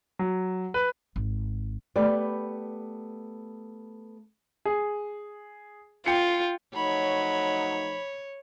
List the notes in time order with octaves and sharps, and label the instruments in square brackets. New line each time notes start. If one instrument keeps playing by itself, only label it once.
[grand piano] F#3
B4
[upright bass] G#1
[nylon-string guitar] A3 B3 G4 B4 D5
[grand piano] G#4
[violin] F4 [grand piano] G5 C#7
[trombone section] F3 A3 D#4 [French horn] F#3 [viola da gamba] C#5 [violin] B5